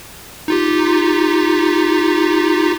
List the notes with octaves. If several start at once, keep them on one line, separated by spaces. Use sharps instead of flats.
D#4 F4 G4